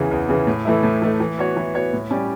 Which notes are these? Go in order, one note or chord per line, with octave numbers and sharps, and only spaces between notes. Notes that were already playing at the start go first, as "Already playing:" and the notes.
Already playing: E2 C#3 E3
E2
C#3 E3
A2
E3 A3 E4
A2
E3 A3 E4
E3
B3 F#4 C#5
E3
B3 F#4 C#5
A2
G3 C#4 G4 D5